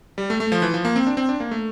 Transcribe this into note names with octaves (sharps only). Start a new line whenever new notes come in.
G3
A3
A3
F3
E3
F3
A#3
C4
D4
C4
D4
A#3
A3